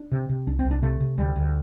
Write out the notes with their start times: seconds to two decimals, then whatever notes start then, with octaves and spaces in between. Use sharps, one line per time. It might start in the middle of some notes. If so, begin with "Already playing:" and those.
Already playing: D4
0.12 C3
0.29 C3
0.47 C2 D4
0.59 C4
0.65 C2
0.71 D4
0.83 C3 A3
1.00 C3
1.18 D2 G3
1.36 D2